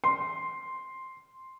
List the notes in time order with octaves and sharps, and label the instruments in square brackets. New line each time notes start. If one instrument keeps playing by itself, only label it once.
[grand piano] C6